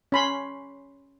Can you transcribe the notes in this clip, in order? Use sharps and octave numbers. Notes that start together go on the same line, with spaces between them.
C#4 B5 C6